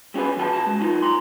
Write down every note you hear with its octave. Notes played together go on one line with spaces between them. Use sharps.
G3 C#4 F#4 G#4 B4
E3 F#4 G#5 A5
C2 A#2 A5
G#3
F#3 D#4 F4
A#5 C6